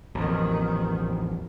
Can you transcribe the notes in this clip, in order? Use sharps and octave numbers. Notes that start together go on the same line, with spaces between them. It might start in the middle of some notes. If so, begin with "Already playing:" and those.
A1 F2 A#2 D#3